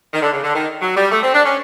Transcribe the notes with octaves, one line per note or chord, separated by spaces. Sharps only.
D#3
D3
C#3
D3
D#3
F#3
G3
A3
C4
D4
C#4